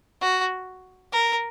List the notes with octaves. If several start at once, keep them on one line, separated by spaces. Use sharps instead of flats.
F#4
A#4